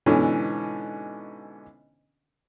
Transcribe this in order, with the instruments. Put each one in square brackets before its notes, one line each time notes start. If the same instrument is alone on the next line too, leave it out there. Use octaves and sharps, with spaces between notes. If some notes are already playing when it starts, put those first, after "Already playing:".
[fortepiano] G#2 B2 D3 E3 C#4 D4